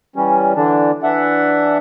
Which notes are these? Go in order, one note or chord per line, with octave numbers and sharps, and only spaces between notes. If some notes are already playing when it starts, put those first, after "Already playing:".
E3 G3 C#4
D3 E3 D4
E3 D4 E5 F#5